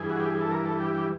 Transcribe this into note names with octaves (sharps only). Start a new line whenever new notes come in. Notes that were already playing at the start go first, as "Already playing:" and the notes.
Already playing: G2 E3 G#4
F#4
G4
G#4
A4
A#4
A4
G4
G4